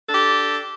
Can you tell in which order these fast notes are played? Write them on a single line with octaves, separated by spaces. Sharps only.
A4 D4 G4